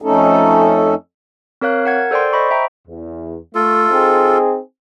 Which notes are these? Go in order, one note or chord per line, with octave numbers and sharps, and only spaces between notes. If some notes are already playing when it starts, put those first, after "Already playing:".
F2 A3 C#4 D#4 A4
C4 A#4 C#5 F5 F#6
A#4 F#5 G#6
A4 C5 D5 G5 C6
C5 D#5 B5 C#6
E5 G5 A#5
E2
A3 F4 A4
C4 D#4 G#4